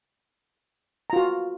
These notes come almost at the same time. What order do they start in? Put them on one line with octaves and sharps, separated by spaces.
A#5 F4 F#4